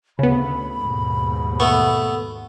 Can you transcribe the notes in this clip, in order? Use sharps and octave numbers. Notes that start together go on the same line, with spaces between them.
D2 C#3 B3 B5
D#2 G#2 B2
A3 B3 C#6